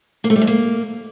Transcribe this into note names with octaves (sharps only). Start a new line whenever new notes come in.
A#3
A3
G3
F2
A#3